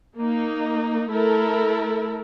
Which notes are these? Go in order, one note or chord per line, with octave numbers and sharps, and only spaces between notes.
A#3 D#4
A3 E4 A4 A#4